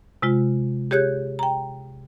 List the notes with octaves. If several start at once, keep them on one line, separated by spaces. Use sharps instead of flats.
C3 G#3 F4
G4 G#4 C#5 F#6 G6
G5 A#5